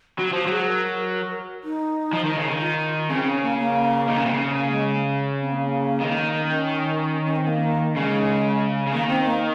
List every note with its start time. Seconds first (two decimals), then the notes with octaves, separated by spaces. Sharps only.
0.18 F#3 F#4
0.33 F3 F#4
0.47 F#3 G#4
0.67 A#4
1.64 D#4
2.13 F3
2.25 D#3
2.37 C#3
2.48 D#3
2.61 F4
3.10 C#3 C4
3.26 C#4
3.42 A#3
3.58 A#3
4.08 D#3
4.17 C#3
4.26 C3
4.34 C#3
4.56 A#3
4.71 G#3
5.41 C4
5.52 A#3
6.01 D#3
6.50 C#4
7.26 C#4
7.36 C4
7.47 A#3
7.95 C#3 G#3
8.86 C#3
8.92 D#3 A#3
9.08 C4
9.25 A#3